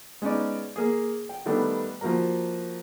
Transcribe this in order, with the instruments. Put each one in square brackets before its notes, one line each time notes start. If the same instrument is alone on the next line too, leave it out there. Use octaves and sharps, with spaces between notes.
[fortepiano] G#3 B3 C#4 D#4 D5
A#3 G#4
G5
D#3 G3 A3 B3 D4
F3 A#3 F#4 A#4 A#5